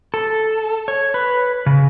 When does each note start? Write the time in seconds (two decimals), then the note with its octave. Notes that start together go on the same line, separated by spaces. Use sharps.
0.14 A4
0.88 C#5
1.14 B4
1.66 C#3